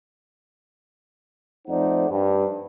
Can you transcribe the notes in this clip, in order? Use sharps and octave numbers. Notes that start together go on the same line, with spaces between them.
F2 A3 D#4 C5 D5 F#5
G2